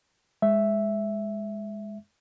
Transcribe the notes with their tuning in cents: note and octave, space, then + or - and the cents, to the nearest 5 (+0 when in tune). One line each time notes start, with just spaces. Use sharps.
G#3 -5 E5 +0